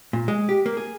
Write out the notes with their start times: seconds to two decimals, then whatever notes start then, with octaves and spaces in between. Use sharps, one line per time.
0.13 A#2
0.28 G#3
0.49 G4
0.66 A#3
0.77 G#4